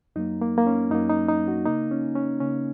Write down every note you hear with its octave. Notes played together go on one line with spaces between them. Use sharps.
F#2 F#3 A#3 D#4
A#3
A#3
C#4
F#2 F#3 A#3 D#4
D#4
D#4
F#4
C#3 A#3 D#4
C#4
C#4
C#3 A#3 C#4